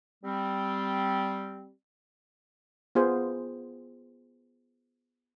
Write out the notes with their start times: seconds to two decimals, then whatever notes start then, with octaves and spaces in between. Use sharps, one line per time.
0.24 G3 C4
2.95 B3 F4 G#4 C5